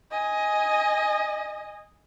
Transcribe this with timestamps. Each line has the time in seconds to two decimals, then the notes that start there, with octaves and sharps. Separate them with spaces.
0.11 D#5 G#5